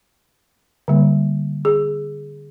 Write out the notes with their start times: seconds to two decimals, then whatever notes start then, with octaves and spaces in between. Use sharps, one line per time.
0.88 D3 G3 A#3
1.65 G#4